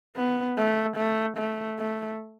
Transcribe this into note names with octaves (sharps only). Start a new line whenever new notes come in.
B3
A3
A3
A3
A3